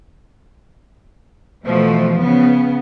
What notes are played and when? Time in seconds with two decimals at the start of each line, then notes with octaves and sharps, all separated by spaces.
1.66 B2 E3 F3 A3
2.20 C#3 B3